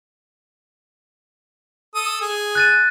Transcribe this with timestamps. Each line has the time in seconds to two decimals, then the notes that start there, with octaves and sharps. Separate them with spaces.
1.95 A4 D#6
2.21 G#4
2.55 F#6 A6 D#7